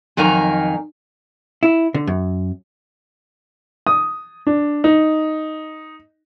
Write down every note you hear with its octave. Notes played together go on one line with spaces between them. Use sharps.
F2 D#3 F#3 A#4 G#5 A#5
E4
D3
F#2
D#6
D4
D#4